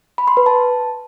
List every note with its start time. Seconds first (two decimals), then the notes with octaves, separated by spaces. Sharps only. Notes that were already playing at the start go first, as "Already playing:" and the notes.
0.18 B5
0.28 C6
0.37 B4
0.46 A5